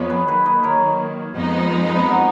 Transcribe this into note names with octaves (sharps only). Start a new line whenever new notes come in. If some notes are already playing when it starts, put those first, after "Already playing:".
Already playing: F2 F3 B3 C#5 D#5
G#4 B4
D#3 F#3 A#3 G#4 B4
B4 D#5
A#4 C#5
F2 F3 G#3 B3 D#4
G#4 B4
F#4 A#4